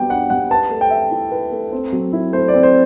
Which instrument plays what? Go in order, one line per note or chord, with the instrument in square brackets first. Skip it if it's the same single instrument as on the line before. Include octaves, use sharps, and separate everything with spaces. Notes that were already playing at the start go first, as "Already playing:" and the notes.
Already playing: [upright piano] G3 B3 F#4 [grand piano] G5
[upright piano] D4 [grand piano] F#5
[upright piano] G3 [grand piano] F#5
[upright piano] B4 [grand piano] A5
[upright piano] A3
[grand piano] G5
[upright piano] E5
E4
B4
A3
C4
F#3
E4
[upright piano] A3 [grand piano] C5
[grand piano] D5
[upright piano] C4
[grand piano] C5